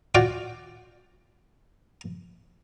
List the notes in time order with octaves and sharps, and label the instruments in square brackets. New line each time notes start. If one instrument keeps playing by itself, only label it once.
[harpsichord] F4 F#4 D5 G5